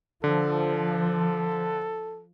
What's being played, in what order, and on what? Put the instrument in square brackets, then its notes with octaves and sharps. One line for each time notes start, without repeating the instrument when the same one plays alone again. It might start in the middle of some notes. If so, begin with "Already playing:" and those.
[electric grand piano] D3 [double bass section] F3 [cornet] A4